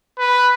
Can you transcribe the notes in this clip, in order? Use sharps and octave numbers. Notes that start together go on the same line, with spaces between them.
B4